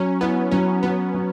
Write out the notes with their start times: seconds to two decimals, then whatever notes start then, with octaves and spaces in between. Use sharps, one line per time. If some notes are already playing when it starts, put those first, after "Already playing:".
Already playing: F#3 C#4
0.21 B3 E4
0.51 F#3 C#4
0.83 F#3 B3
1.14 F#3